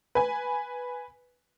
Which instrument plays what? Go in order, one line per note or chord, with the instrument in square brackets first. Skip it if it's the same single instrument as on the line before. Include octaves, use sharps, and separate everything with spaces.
[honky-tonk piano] B4 G#5